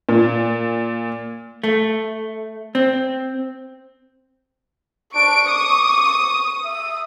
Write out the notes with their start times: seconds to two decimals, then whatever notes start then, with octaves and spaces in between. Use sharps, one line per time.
0.09 A#2
1.63 A3
2.75 C4
5.15 D4 C#6 D7
5.48 D6 D#6
6.65 E5 D#6